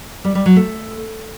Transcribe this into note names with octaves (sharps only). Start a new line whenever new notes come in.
G3
G3
F#3
A3